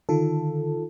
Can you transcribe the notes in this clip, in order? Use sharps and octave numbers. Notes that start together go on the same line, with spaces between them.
D3 D#3 F4 A4